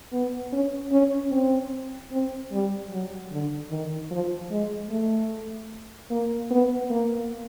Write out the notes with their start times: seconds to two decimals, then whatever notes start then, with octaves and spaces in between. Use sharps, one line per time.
0.12 B3
0.53 C#4
0.92 C#4
1.31 C4
2.11 C4
2.52 G3
2.90 F#3
3.31 D3
3.70 D#3
4.11 F3
4.50 G#3
4.90 A3
6.10 A#3
6.50 B3
6.90 A#3